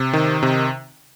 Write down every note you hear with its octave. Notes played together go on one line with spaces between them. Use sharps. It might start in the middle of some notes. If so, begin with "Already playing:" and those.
Already playing: C3
D#3
C3